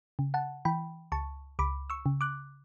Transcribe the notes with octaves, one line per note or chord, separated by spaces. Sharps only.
C#3
F#5 A5
E3 G5 B5
C#2 A5 C#6
C#2 B5 D6
C#6 E6
C#3
D6 F#6